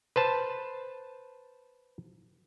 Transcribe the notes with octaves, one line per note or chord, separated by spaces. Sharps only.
B4 C5 A5